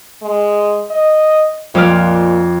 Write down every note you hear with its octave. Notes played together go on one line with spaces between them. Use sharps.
G#3
D#5
F2 A#2 D6 F6